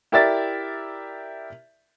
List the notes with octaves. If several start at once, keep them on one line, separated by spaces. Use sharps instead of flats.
E4 G4 A#4 D5 E5 A6